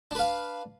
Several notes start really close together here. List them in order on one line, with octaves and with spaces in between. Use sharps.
D4 B4 F5